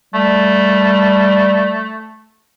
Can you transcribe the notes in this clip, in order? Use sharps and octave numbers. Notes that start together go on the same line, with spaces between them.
G3 A3